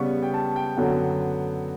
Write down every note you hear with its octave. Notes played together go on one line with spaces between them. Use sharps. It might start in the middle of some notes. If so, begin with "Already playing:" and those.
Already playing: C#3 G3 B3 C#6
G5
A5
G5
F#2 D3 F#3 B3